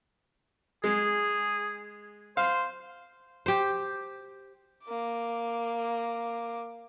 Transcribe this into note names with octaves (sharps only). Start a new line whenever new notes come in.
G#3 G#4
C5 F5
G4 C5
A#3 D6